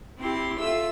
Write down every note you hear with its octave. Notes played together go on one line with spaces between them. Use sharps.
C4 E4 G4 C6
F4 A4 E5 E6